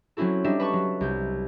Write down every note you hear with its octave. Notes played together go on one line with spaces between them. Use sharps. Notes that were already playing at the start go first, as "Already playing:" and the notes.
F#3 C4 C#4 E4 F#4 A4
G3 D4 D#4 E5 E7
B4 A5 C#6
F#3
C2 G6